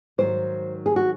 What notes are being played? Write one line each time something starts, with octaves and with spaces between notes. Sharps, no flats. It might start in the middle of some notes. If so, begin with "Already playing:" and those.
G#2 D#3 F#3 C5
G#4
F#4